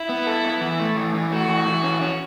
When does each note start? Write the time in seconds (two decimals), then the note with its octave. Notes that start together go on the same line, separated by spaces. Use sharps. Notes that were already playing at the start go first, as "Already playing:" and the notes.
Already playing: E4
0.09 B3
0.27 A4
0.45 B3
0.61 E3
0.80 A3
0.96 E3
1.14 E3
1.32 A3 F#4
1.48 E3
1.67 E3
1.83 C#4
2.01 C#4